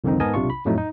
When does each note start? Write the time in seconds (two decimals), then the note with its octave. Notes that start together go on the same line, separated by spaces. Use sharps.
0.04 C2 F2 D3 D#3 C4 D#4
0.20 G#2 B3 A#4 D#5 G#5 A5
0.34 B1 C3 D4 F4 C#6
0.50 B5
0.65 F2 A2 F#3 A3 D#4
0.78 D#4